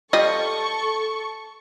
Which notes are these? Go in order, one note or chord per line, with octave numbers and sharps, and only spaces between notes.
G3 F4 A4 D#5 C#6